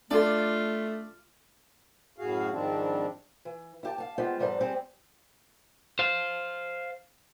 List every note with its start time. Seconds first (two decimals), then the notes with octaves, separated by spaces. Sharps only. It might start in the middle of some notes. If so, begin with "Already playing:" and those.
0.11 A3 D4 F4 A4 D5
2.18 F#2 A2 F#4 G#4 F5
2.51 G#2 D#3 F3 G3 C4 D4
3.45 E3
3.83 E4 G4 A5
3.98 F5 A5
4.18 G#3 B3 F4 G4 C5
4.39 E2 G#2 G3 A4 C5
4.60 G3 G#3 C4 G4 G#4
5.99 C5 F5